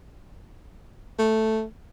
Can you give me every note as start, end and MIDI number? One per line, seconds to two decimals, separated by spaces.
1.19 1.63 57